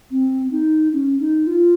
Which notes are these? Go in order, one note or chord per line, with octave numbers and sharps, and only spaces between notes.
C4
D#4
C#4
D#4
F4